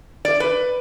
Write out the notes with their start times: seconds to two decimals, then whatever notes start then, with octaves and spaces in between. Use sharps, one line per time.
0.25 D5
0.40 B4